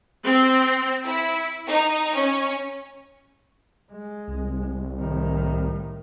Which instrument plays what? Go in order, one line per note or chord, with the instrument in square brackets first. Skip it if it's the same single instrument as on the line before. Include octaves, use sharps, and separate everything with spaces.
[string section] C4
E4
D#4
C#4
[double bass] G#3
[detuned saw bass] C2
[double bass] A2 D#3